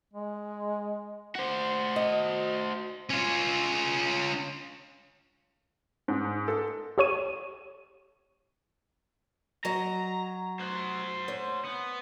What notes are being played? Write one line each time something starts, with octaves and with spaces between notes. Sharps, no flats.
G#3
F#4 C5
D#5
C#4 F4
G#2
A4
G4 A4 C#5 C#6 D#7
F#3 D#5 A#5
C5 F#5
C#5
B3